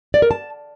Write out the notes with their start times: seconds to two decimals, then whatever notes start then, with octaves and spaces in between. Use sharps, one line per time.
0.14 D5
0.22 A#4
0.31 A5